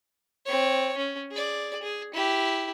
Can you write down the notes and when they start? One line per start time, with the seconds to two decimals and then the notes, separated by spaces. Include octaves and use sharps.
0.46 C4 C#5
0.97 C#4
1.31 G#4 D5
1.82 G#4
2.14 E4 G4